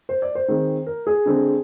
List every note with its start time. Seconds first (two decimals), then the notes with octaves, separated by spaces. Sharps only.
0.09 C5
0.22 D5
0.35 C5
0.48 D#3 G#3 C4
0.87 A#4
1.07 G#4
1.26 D3 G#3 C4